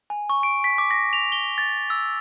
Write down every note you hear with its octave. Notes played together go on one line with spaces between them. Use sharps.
G#5
C#6
D7
B6
D6
A#6
F7
G7
A6
E6